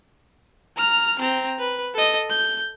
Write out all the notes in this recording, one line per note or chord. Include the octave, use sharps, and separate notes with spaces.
A#5 F6
C4 A#5
B4
A4 D#5
G6